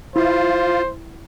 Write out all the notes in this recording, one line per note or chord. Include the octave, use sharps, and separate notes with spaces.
E4 F4 C5